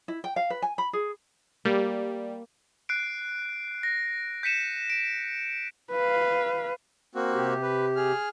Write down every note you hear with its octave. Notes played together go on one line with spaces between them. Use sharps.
E4
G5
F5
B4
G#5
B5
G#4
G3 A#3
F#6 C7 D7
A#6
G6 B6 C#7 D#7 E7
D7
B4 F5
A#3 C4 F#4
C3 G4
B4
G#4 F6